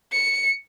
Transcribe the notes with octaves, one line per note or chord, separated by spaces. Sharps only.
C#7